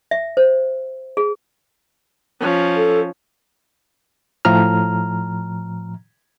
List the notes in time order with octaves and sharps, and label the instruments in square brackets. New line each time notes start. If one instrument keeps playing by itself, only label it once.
[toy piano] E5
C5
G#4
[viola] F3 C#4
[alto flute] A4
[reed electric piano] A2 F3 A#5 F6